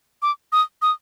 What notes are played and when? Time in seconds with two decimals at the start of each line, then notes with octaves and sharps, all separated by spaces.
0.22 D6
0.52 D#6
0.82 D#6